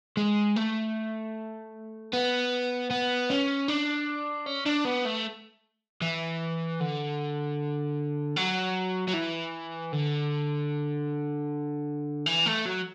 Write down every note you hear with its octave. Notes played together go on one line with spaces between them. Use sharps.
G#3
A3
B3
B3
C#4
D4
C#4
D4
B3
A3
E3
D3
F#3
F#3
E3
D3
E3
A3
F#3